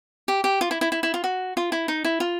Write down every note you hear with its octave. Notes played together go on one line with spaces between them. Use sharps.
G4
G4
F4
E4
E4
E4
E4
F4
F#4
F4
E4
D#4
E4
F4